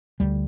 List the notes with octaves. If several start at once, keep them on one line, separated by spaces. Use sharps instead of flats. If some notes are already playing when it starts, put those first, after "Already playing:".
D2 D3 G3